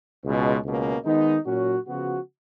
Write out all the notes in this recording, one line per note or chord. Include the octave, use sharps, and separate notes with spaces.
C#2 B2 G#3
C#2 B2 A#3 C#4
D#3 G#3 B3 D#4
A#2 F#3 C#4 F#4
C#3 F3 B3 F#4